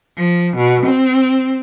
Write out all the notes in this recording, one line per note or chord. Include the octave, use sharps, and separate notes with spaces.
F3
B2
C4